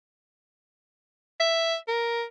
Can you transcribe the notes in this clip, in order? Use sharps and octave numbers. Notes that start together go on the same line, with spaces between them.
E5
A#4